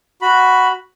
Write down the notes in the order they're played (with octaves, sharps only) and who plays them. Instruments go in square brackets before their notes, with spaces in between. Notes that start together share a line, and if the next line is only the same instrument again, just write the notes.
[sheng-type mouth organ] F#4 B5